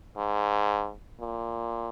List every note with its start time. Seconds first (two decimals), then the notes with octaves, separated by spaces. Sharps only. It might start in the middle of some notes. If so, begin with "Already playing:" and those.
0.17 G#2
1.20 A#2